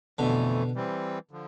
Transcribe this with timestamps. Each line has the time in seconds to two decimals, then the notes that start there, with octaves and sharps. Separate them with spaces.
0.19 F2 B2 D3 E3 A3
0.75 E3 G3 C4
1.31 D3 F3